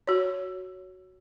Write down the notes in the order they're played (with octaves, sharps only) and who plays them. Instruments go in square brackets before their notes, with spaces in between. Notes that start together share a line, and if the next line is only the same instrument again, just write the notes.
[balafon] F#4 C#5